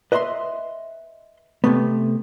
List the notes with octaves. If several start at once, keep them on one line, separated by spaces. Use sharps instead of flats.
B4 D#5 E5 B5 C6
C3 A3 B3